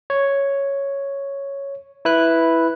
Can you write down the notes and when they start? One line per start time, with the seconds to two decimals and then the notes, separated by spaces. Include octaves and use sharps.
0.10 C#5
2.05 E4 B4 F#6